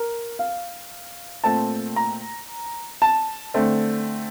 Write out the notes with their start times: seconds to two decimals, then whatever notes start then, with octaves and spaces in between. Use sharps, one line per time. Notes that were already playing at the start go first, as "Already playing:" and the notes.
Already playing: A#4
0.39 F5
1.44 A#2 A3 C4 A5
1.96 A#5
3.02 A5
3.54 D3 A3 C4